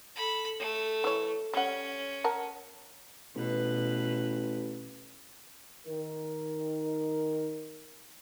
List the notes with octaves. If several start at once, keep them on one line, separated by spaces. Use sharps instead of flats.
A4 B5
A3
E3 C#5
G3 C#4 F#5
A#4 F#5 A5
A1 B2 B4
D#3 D#4 A#4